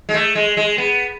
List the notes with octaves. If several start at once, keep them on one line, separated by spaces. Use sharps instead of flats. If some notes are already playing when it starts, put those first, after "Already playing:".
G#3
A3
G#3
G#3
B3